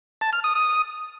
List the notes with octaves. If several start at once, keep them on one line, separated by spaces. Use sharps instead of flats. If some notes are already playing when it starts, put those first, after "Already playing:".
A5
F6
D#6
D#6